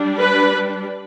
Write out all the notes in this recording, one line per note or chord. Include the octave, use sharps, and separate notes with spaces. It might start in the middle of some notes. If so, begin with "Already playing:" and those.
Already playing: G3 D4
B4